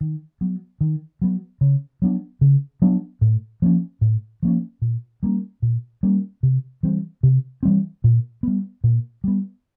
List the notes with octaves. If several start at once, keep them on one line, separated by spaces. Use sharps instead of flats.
D#3
F#3 B3
D#3
F#3 B3
C#3
F#3 B3 D4
C#3
F#3 B3 D4
A2
F3 A#3 C#4
A2
F3 A#3 C#4
A#2
G3 A#3 C#4
A#2
G3 A#3 C#4
C3
E3 G3 C4
C3
E3 G3 C4
A#2
G3 B3
A#2
G3 B3